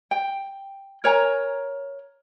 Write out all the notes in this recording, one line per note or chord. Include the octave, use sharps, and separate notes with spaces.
G5
A#4 C#5 G#5 A#5